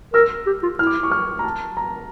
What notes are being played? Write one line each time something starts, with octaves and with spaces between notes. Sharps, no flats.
A#4 E6
G4
F4
E4 F6
D6
C#6
F6
A#5
A5
A#5